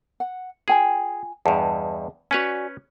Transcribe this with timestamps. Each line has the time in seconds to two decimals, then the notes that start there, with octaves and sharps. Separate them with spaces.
0.20 F#5
0.68 F4 G#4 G5 G#5
1.46 E2 G2 G#4 D#5 A5
2.31 C#4 F#4 B4 C#5 D5 G#5